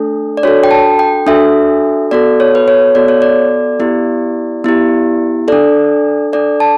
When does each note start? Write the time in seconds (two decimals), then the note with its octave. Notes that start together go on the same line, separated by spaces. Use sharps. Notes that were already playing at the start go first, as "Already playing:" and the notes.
Already playing: A3 D4 A4
0.37 D5
0.43 D4 F#4 A4 C#5
0.64 G5
0.71 A5
0.99 G5
1.27 D4 F#4 A4 E5
2.11 B3 F#4 A4 D5
2.40 C#5
2.55 B4
2.68 C#5
2.95 B3 F#4 A4 D5
3.08 C#5
3.22 D5
3.80 B3 E4 G4
4.64 B3 E4 G4
5.48 D4 A4 D5
6.33 D4 A4 D5
6.60 A5